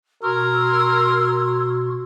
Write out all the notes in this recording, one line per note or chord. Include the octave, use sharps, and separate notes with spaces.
B2 F#4 A#4 C6 E6 G#6